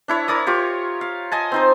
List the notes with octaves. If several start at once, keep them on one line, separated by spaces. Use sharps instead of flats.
D4 E4 C#5
A#4 C#5 D5 D#6
F4 G4 C#5
F5
D#5 G#5 A5
C4 D#4 C5